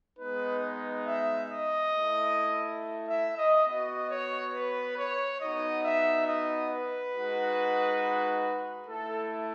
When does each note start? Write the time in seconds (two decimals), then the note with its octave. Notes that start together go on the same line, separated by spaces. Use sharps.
0.19 G#3 B3 D#4 B4
1.07 E5
1.50 D#5
1.93 A3 E4
3.09 E5
3.38 D#5
3.67 B3 F#4 D#5
4.10 C#5
4.54 B4
4.98 C#5
5.41 B3 D#4 F#4 D#5
5.84 E5
6.28 D#5
6.71 B4
7.15 G#3 D#4 F#4
8.89 A3 E4 A4